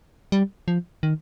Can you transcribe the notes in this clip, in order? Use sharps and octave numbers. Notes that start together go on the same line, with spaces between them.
G3
F3
D#3